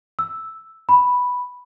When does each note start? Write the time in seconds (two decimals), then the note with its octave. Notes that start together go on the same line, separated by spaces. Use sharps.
0.19 E6
0.89 B5